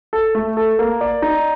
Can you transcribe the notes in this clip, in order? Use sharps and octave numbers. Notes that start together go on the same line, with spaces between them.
A4
A3
A4
A#3
D5
D#4